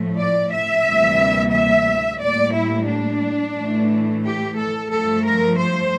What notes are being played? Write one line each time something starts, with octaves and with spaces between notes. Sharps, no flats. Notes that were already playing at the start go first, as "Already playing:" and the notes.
Already playing: A2 F3 A3
D5
E5
D2 C3 E3 G3 A#3
E5
A2 G3 A#3 D5
E4
D4
A2 E3 A3
G4
A4
G2 F3 A3 A4
A#4
C5